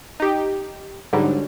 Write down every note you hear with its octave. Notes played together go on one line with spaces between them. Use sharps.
D#4 G4
G#2 D3 F#3 G3